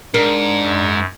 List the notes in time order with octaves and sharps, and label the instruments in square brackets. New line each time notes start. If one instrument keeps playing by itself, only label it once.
[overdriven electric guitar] G#2 [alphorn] D4 [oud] A#4
[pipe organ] F#2